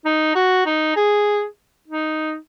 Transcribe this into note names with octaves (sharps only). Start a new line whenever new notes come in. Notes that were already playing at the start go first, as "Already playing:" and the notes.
D#4
F#4
D#4
G#4
D#4